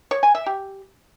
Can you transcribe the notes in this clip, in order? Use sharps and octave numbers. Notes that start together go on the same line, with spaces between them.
C#5
G#5
E5
G4